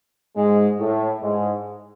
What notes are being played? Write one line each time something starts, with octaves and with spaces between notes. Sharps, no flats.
G#2 G#3
A2 A3
G#2 G#3